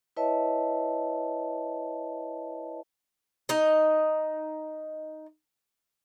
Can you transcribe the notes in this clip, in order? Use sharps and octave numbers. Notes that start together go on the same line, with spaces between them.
E4 B4 C#5 D#5 E5 A5
D#4 D#5